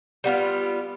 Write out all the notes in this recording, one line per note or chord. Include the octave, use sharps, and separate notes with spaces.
G3 B3 D#4 F4